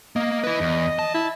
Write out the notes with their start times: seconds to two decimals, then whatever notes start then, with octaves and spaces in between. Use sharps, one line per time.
0.16 A#3 D#5
0.44 E4 B4
0.61 E2
0.99 A5
1.14 E4